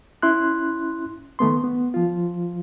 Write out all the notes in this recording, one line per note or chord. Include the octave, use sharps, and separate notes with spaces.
C#4 E4 C6 F#6
D#3 A3 B3 C6
B3
F3 F4